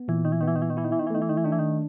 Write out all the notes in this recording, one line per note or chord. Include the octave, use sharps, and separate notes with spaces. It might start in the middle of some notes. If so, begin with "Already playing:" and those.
Already playing: B3
A#2 E3
D#3
E3
D#3 B3
E3
D#3
E3
D#3
E3 E4
D#3
E3
D#3
E3
D#3 A3
E3
D#3
E3
D#3 D4
E3
D#3